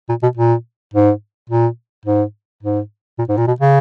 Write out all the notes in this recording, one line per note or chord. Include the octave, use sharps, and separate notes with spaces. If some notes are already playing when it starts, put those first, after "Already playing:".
A#2
B2
A#2
G#2
A#2
G#2
G#2
A#2
G#2
A#2
B2
C#3